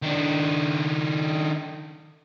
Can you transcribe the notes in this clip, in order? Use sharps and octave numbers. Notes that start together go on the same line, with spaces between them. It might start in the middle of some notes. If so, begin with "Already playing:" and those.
D#3 D4